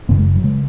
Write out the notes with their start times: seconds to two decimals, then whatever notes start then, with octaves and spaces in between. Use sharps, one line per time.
0.09 F#1 F#2 C#3 B3
0.18 G#3
0.36 F#3
0.44 C#3 G#3